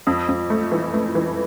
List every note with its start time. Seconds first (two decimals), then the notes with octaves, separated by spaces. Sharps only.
0.07 F2
0.28 F2
0.50 A3
0.72 E3
0.94 A3
1.15 E3